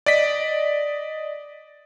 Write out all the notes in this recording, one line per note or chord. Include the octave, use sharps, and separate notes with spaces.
D5 D#5 B6